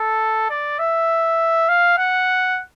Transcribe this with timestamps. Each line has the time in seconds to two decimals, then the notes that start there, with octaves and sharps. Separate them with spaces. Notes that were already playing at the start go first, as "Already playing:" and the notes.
Already playing: A4
0.50 D5
0.79 E5
1.69 F5
1.98 F#5